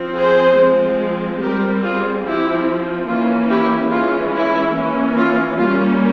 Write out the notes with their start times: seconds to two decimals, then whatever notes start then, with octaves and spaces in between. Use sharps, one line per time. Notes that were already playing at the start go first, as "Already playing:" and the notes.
Already playing: F3 C4
0.17 G#4 C5
0.58 F3 G#3 C4
1.41 G3 C4 G4 A#4
1.83 F4 G#4
2.25 F3 C4 E4 G4
3.07 E3 A#3 C#4 F4
3.49 E4 G4
3.91 E3 G#3 C#4 F4
4.33 E4
4.75 E3 A#3 C#4
5.17 F4
5.58 G3 A#3 C#4 F4